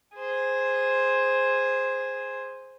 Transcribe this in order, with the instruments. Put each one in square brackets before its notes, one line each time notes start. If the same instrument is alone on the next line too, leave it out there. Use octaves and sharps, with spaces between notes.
[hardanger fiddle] G#4 C5